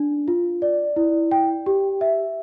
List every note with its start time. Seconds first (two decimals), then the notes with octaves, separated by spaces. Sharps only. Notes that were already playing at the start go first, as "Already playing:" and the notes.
Already playing: D4
0.28 F4
0.62 D5
0.96 E4
1.32 G5
1.66 G4
2.01 E5